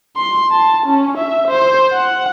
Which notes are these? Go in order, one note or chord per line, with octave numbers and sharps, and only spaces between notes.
C6
A5
C#4
E5
C5
F#5